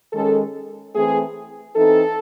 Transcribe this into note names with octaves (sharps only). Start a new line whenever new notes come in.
D#3 G#3 C#4 A4
E3 A3 C4 G#4
E3 C4 D#4 A4